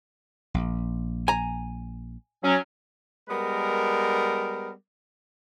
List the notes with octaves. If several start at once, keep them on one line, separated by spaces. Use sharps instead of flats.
A#1
G#5 A#5
F#3 C#4
G3 G#3 B3 A#4